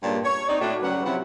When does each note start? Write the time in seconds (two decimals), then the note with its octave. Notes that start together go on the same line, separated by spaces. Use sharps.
0.03 G2 A#2 C#3 D4
0.24 C#5
0.48 C4 D#4 D5
0.61 A2 D4 F#4
0.82 F#2 C#3 G3 C#4 B4 F#5
1.05 C3 F3 F#3 E4 F#5